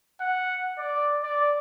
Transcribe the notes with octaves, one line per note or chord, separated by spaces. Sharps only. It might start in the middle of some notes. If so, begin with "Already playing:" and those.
F#5
D5
D5